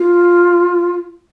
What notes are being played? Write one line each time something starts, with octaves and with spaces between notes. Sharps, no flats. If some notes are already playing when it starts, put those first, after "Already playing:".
Already playing: F4